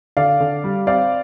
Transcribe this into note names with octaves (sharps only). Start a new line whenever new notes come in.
D3 D5 F5
D3
G3
C4 D5 F5